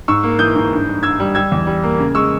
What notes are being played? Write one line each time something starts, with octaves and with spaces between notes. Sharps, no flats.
G#2 C#6 E6
A#3
E3 D#6 G6
G#2
G2
G2
G2 E6 G#6
G3
G3 E6 G#6
E2
G3
A#3
C#3
G#3 C#6 E6